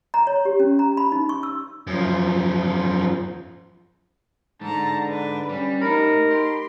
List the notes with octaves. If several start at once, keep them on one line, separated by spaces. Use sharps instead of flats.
A#5
C#5
G4
C#4
A#5
B5
D#4
C#6
E6
F#2 F3
D3 G#3 D#4 A5 A#5
D4 B4
G3 C#4
A3 D#4 G4 A#4 B5
G4 B5 C6